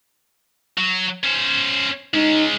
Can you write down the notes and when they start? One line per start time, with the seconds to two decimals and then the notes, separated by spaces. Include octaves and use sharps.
0.78 F#3
1.23 C#4 C5
2.14 G#3 C#4 D#4